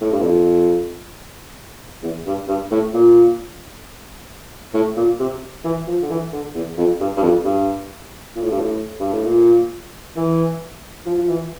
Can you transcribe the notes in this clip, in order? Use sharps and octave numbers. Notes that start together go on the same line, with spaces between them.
A2
G2
F2
E2
G2
G2
A2
A#2
A2
A#2
C3
E3
F3
D3
E3
D3
E2
F2
G2
G2
F2
G2
A#2
A2
G2
A2
G2
A2
A#2
E3
F3
F3
E3